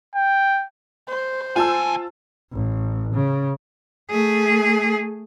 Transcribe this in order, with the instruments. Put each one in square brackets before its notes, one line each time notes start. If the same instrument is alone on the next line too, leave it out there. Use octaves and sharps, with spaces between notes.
[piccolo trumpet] G5
[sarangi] C5
[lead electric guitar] D#2 G#5 [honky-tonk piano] F4 A5 E6
[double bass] A1
C#3
[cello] A3 G#4